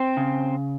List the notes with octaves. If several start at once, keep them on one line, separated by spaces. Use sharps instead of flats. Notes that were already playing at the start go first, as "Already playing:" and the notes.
Already playing: C4 C5
C#3